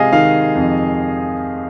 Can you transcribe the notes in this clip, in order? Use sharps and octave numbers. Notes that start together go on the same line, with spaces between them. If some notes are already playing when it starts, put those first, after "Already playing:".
Already playing: C3 G#3 F4 G#4 D#5 F5
D#3 F5
F2